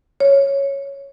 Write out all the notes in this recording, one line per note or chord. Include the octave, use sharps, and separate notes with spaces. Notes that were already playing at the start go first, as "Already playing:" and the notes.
C#5